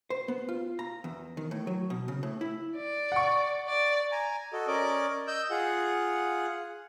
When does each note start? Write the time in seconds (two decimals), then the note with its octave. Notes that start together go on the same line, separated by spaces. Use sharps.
0.10 C5
0.28 B3
0.49 F4
0.79 A#5
1.04 E2
1.37 D#3
1.51 A2
1.67 F#3
1.90 B2
2.08 C#3
2.23 A2
2.41 E4
2.77 D5
3.12 F#5 C#6
3.68 D5
4.12 G#5 A#5
4.53 F#4 A4 D#5
4.67 C#4 A#4 D5 D#5 D6
5.28 D#5 E6 G6
5.50 F4 G#4 F#5